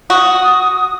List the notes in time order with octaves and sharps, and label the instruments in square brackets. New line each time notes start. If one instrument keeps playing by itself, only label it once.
[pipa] F#4 [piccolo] D#6